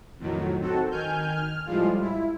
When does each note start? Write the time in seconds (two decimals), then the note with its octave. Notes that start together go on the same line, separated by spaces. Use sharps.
0.19 F2 A2 D#3 F#3
0.60 D#3 C4 F#4 A4
0.91 D#3 G#5 F6 G6
1.35 F6
1.66 A2 F3 G3 G#3 F4
2.01 E4